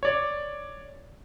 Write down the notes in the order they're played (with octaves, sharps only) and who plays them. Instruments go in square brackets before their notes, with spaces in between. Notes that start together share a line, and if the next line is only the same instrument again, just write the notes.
[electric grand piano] C#5 D5